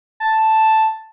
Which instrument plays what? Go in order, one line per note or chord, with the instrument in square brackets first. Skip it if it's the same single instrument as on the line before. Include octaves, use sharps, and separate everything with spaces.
[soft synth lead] A5